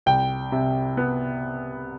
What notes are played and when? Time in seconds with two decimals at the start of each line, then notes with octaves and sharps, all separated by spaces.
0.06 C2 G5
0.52 C3
0.97 B3